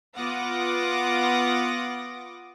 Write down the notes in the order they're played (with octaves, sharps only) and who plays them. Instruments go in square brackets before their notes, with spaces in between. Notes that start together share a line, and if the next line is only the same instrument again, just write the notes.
[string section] B3 F4 F#5 D6 D#6 A#6